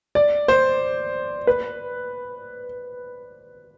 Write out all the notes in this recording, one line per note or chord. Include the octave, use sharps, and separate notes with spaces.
D5
C5
B4